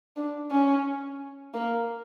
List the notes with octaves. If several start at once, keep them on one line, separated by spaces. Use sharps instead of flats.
D4
C#4
A#3